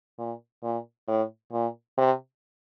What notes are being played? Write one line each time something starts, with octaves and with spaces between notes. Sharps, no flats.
A#2
A#2
A2
A#2
C3